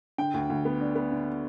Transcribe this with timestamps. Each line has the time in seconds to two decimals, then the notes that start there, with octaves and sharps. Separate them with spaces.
0.18 D3 G5
0.34 D2
0.50 D2
0.65 B3
0.81 D4
0.95 B3
1.12 D3